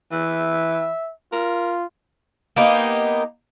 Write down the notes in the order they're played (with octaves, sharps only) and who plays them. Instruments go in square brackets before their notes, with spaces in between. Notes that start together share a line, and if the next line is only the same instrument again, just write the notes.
[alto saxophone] E3 [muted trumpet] E5
[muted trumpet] F4 [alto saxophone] A#4
[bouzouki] A#3 B3 D#4 G4